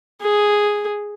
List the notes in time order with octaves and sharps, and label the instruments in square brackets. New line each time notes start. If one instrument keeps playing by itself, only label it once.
[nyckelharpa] G#4